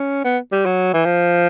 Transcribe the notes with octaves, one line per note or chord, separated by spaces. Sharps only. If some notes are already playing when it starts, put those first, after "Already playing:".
Already playing: C#4
B3
G3
F#3
E3
F3